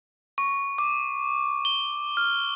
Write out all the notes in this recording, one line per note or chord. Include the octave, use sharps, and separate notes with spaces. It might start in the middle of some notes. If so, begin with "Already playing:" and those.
C#6
D6
G7
F6